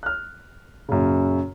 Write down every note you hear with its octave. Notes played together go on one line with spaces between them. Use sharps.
F6 F#6
F#2 A#2 C#3